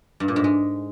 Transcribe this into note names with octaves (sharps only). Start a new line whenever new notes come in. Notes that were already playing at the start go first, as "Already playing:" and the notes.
G2
A#2
G#2
G#3